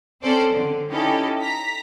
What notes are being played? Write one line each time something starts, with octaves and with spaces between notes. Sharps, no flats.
C4 C#4 A4 C5 D5
D3
C#4 D#4 E4 G4 A4
A#5 B6